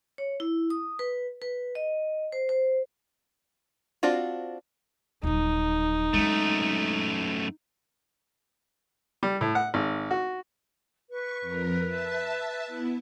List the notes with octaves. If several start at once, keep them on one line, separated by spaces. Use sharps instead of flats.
C#5
E4
D#6
B4
B4
D#5
C5
C5
C4 D4 F4 F#4
D#1 F#3 D#4
F#2 G#3 A3 C4
G3
A2
F#5
G#1
F#4
B4 C#6
F2 A#4
E5 A5
B3 E4